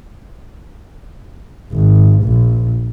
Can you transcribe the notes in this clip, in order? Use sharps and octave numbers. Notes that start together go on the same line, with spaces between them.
G#1
A#1